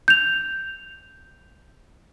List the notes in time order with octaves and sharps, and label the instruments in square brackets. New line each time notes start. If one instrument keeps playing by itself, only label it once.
[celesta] G6 F7